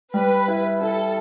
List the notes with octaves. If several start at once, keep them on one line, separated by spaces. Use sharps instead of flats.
G3 B4
E4
E4 A4